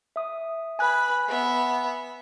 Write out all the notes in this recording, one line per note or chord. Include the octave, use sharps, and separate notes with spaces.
E5 D#6
B4 G#5 B5 F#6
B3 E5